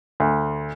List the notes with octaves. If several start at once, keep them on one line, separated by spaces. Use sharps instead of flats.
D2